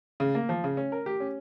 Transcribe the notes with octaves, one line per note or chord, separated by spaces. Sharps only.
C#3
A#3
F3
C#3
C#4
A#4
G4
C#4